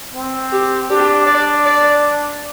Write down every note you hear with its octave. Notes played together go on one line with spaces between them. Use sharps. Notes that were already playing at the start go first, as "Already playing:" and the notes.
C4
G4
D4 G4
D5
D5